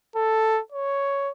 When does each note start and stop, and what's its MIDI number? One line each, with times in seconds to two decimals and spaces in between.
0.16 0.60 69
0.72 1.31 73